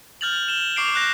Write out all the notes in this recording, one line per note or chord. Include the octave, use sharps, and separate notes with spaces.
F6 G6 A6 F7 F#7
F7
E7 G7
C#6 D6 C7 D7
F#6 A#6